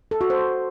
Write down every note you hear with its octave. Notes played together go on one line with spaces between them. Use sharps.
A4
F#4
C5